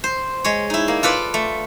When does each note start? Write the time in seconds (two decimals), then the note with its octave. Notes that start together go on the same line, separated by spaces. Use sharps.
0.04 C5
0.44 G#3 C#5
0.70 D#4 E4
0.88 A#3
1.03 F4 A4 B4 D5
1.34 A3